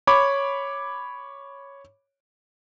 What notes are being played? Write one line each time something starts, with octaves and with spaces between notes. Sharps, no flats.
C#5 B5 D6